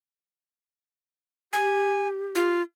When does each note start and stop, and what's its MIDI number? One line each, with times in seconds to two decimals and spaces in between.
1.53 2.53 67
1.53 2.08 80
2.35 2.62 65